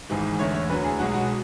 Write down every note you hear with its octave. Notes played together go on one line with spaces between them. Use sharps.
G#1 G#2 E3 G#3
E2 D3 A3 C#5
C#5
D2 D3 F#3 B4
G#4
B1 B2 G#3 F#4
F#4